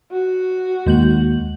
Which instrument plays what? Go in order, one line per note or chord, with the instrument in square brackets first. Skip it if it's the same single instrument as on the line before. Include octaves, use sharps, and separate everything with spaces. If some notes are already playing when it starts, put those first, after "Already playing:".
[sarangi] F#4
[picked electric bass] D#2 D#3 A#3 [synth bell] G#3 G6 F#7